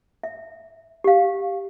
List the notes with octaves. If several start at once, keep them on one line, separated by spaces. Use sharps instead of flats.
E5
G4 F5